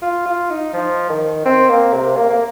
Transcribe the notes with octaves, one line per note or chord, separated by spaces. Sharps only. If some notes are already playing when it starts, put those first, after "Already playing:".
F4
F4
D#4
F3
D#3
C4
A#3
C3
A#3
A#3